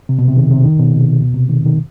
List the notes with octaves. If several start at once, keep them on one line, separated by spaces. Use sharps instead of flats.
C3
B2
C3
D#3
C3
D#3
B2
C3
B2
C3
D#3
D#3